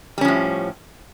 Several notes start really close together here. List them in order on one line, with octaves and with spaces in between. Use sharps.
G3 C#4 F3 A2